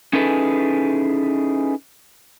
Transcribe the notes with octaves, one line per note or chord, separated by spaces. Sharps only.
C#4 D#4 E4 G#4 A4 B4